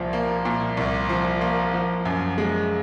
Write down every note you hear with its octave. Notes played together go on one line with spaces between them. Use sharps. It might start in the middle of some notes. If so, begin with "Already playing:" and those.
Already playing: C2 A#2 F3
A#3
A#2
C2
F3
A#3
F3
F#2
G#3